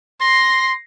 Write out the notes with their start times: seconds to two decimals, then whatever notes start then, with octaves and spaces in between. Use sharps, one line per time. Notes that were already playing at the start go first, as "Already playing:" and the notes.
0.21 C6 A#6 C7